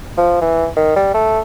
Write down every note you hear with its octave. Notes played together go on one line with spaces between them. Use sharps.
F3
E3
D#3
G3
A3